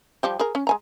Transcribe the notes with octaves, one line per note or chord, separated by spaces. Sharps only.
F3 G3 G4
G#4 A#4
C#4
G#3 G#5 A#5